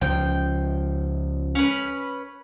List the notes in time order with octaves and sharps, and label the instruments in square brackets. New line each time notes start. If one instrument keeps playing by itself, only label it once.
[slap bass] C#2 F3 [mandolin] G5
[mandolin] C#4 B4